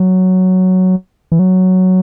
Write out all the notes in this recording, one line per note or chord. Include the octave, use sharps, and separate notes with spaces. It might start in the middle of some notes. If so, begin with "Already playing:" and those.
Already playing: F#3
E3
F#3